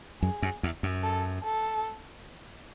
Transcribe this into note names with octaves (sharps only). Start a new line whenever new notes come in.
F#2 G#4
F#2
E2
F#2
A4
A4